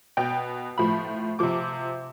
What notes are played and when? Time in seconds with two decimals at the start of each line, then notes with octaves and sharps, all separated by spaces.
0.17 B2 G5
0.78 A2 F3 B5
1.39 C3 F3 D6